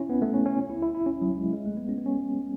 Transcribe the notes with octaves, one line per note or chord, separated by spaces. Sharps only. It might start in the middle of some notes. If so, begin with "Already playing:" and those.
Already playing: C#4 E4
B3
A3
C#4
C#4
E4
E4
E4
C#4
F#3
G#3
G#3
A3
B3
C#4
B3
C#4